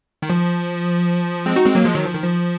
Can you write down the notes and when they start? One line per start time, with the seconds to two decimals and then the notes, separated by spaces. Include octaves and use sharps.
0.22 D#3
0.30 F3
1.46 G#3 C4
1.56 D#4 F#4
1.65 G#3 C4
1.75 F#3 A#3
1.85 F3 G#3
1.95 D#3 F#3
2.05 F3
2.14 D#3
2.24 F3